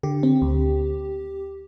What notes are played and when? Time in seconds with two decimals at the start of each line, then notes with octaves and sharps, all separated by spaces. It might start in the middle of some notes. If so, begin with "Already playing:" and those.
0.03 D3 G4
0.23 C4
0.42 D2